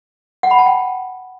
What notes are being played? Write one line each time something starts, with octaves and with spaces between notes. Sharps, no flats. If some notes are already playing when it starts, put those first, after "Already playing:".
F#5
B5
A5
G5